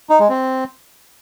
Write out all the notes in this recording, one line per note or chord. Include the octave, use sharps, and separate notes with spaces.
D#4
G#3
C4